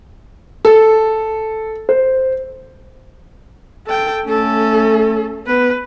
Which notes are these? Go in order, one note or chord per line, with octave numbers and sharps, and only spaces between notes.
A4
C5
A4 G5
A3 C#4 A4
B3 B4